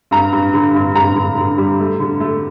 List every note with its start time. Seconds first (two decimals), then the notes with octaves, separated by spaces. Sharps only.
0.11 G2 A#5
0.32 G2
0.54 D3
0.75 G2
0.95 G2 A#5
1.16 D3
1.37 D3
1.58 G3
1.80 A3
2.00 D3
2.20 A3